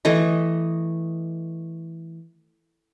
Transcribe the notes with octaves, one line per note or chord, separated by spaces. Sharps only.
E3 A3 D#5